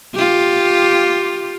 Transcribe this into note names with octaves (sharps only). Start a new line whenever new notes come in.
F4 G4